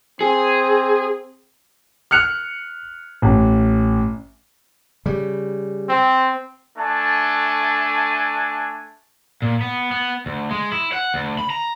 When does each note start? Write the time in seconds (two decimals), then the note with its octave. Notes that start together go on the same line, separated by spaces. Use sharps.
0.21 C4 G#4
2.11 F6 F#6 C#7 F7
3.22 A1
5.06 C#3 G3
5.89 C4
6.77 A3 D4 G#5 A5
9.42 A#2
9.61 B3
9.91 B3
10.26 D2
10.51 G#3
10.72 E4
10.93 F#5
11.14 D2
11.39 B5
11.50 A#5